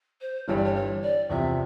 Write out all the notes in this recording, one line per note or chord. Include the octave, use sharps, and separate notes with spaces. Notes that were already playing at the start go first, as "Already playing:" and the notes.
C5
G1 G2 E3 G3 C#5
D5
C#5
C#5
D5
E2 C3 F3 E5